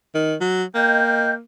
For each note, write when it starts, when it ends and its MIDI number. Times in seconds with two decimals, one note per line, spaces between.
0.15 0.35 51
0.41 0.64 54
0.75 1.40 58
0.75 1.32 75
0.75 1.32 79
0.75 1.32 91